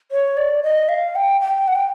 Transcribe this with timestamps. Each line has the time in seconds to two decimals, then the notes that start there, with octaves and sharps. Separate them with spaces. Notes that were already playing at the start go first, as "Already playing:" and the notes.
0.12 C#5
0.37 D5
0.63 D#5
0.89 F5
1.15 G5
1.41 G5
1.68 F#5
1.75 G5